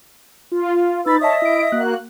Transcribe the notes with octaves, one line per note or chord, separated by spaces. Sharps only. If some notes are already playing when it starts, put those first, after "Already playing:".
F4
D#4 B4 B5 E6 A6
C#5 D#5 E5 A5 D#6
E4 D7
A#3 F#4 F#6